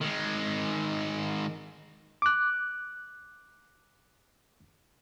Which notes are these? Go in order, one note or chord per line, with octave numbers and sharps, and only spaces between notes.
D#3 G#3
D6 F#6